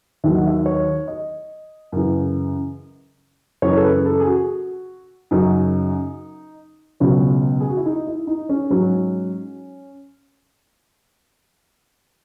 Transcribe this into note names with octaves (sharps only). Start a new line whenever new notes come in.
D#2 D#3 F#3 E5
F#5
E5
C#5
D#5
F#2 C#3 E3
F#2 C#3 E3 C#5
A4
B4
A4
G#4
F#4
F#2 C#3 F#3 D#4
C#2 B2 F#3 C#4
G#4
F#4
E4
D#4
E4
D#4
C#4
G#2 F#3 C#4